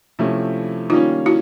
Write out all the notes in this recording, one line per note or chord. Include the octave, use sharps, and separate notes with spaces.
C3 F3 A3 C#4 E4
D#3 G3 A#3 C#4 D#4 F4
E4 F#4